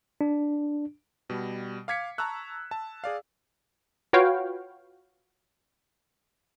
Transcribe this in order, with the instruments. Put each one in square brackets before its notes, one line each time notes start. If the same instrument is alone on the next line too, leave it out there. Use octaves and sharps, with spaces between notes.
[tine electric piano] D4
[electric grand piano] B2 G3
F5 D6 G#6 B6 C#7
A5 A#5 C#6 E6 F#6
A5
G#4 D5 F5
[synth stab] F4 F#4 B4 C#5 F5 G5